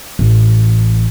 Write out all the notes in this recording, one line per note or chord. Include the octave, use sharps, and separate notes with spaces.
A1